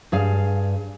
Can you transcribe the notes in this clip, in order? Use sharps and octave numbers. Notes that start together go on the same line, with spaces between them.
G2 G#4 F5